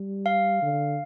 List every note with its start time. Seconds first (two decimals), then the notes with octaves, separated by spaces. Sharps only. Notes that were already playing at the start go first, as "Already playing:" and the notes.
Already playing: G3
0.26 F5
0.62 D3